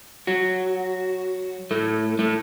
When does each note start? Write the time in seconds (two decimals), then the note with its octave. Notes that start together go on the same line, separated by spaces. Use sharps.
0.27 F#3 F#4
1.71 A2 A3
2.19 A2 A3